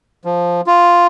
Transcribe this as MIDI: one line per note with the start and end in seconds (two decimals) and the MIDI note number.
0.25 0.61 53
0.67 1.07 65